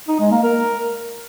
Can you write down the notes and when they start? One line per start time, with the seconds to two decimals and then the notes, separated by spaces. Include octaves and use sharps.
0.08 D#4
0.20 G#3
0.32 A#3
0.43 A#4